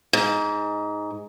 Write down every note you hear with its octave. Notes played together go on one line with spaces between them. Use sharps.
G#2